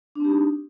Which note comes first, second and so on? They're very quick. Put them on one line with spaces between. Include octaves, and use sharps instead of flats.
D4 C4 G4 D#4